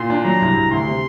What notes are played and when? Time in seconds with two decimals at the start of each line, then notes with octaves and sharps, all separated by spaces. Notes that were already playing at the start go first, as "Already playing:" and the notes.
Already playing: A#2 C6
0.10 D4
0.25 F#3 A#5
0.41 C2
0.56 C2
0.72 D2 C6
0.87 C3